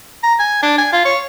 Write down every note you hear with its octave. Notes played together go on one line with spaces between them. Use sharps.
A#5
G#5
D4
G#5
F4
C#5